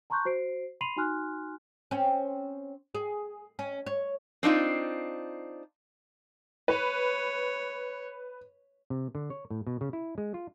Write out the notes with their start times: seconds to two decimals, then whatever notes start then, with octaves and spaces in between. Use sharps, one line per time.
0.10 A5 A#5 C6 C#6 F#6 G6
0.25 F#4 C5 C7 D7
0.81 B5 C6 C7 D#7 F7 F#7
0.96 D#4 F#4 G#5 C6 F6 F#6
1.91 C4 C#4
2.95 G#4
3.59 C#4
3.86 C#5
4.43 C4 D4 D#4 F4
6.68 B4 C#5
8.90 C3
9.15 D3
9.30 C#5
9.50 A2
9.67 B2
9.81 C#3
9.93 E4
10.18 G#3
10.34 F4